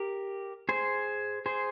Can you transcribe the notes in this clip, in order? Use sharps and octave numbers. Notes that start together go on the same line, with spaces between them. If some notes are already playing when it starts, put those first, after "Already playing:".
Already playing: G4 A#4
G#4 C5
G#4 C5